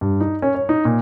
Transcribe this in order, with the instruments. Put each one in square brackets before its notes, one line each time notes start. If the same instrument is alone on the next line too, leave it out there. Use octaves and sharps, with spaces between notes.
[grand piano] G2
D#4
C#4
C#5
D#4
A#2